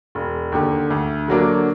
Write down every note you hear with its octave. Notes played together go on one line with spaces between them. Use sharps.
E1
D#2 D3
D2
D3 F#3 A#3 D4